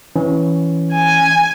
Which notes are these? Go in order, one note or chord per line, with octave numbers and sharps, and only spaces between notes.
E3 C#4
G#5